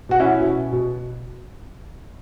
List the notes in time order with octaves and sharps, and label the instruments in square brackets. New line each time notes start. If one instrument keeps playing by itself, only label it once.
[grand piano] B2 F#4
C#4 E4
B2
B2